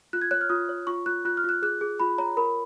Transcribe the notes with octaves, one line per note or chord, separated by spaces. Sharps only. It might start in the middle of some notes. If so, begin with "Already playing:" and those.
F4 F#6
G#6
C#5 F#6
F6
F4 D#6
C#5
F4 C#6
F4 F#6
F4 F#6
F6
F4 F#6
G#4 F#6
G#4
F4 B5
C#5 A#5
A#4 B5